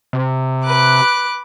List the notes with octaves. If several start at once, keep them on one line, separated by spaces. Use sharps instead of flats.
C3
B4 D6 F#6